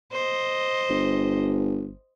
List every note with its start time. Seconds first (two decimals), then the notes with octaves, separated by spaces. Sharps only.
0.13 C5 D#5
0.89 G1